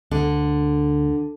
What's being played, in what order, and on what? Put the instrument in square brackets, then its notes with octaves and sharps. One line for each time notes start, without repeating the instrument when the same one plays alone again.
[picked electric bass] D2 [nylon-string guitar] D3